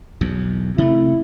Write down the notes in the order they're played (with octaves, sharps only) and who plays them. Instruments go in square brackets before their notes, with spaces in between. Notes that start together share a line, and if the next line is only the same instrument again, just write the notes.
[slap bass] B1 E2
[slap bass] C3 A3 [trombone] E4